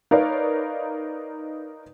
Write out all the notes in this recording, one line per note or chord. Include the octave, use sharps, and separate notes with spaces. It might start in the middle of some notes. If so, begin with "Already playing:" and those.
D#4 A#4 B4 C#5 D5 F5